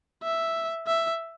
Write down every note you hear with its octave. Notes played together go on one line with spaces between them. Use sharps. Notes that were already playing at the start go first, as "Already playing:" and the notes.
E5
E5